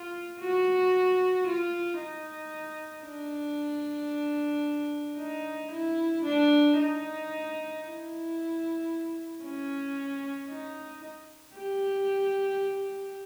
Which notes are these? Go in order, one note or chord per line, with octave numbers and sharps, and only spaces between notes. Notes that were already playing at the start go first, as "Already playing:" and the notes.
Already playing: F4
F#4
F4
D#4
D4
D#4
E4
D4
D#4
E4
C#4
D#4
G4